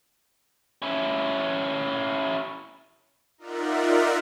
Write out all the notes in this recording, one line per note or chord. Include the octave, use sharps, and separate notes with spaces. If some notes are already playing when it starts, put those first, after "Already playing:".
C#4 E4
D#4 F4 A#4 D5 E5 F#5